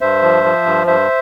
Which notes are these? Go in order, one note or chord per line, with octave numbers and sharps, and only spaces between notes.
G2 C5 E5
F3
F3
G2
G2 C5 E5